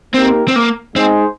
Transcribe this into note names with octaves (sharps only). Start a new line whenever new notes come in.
A#3 C4 D#4 G4 A#4
C4
A#3
G#3 C4 D#4 G#4 C5